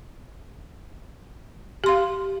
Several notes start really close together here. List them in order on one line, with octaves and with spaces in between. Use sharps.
G4 C6 F5